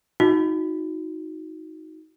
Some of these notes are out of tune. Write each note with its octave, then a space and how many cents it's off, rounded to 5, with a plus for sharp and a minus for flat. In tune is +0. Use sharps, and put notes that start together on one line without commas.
D#4 +20 F#4 -20